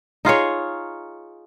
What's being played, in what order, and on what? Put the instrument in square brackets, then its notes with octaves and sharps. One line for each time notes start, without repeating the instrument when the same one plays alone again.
[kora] D#4 F4 G#4 C#5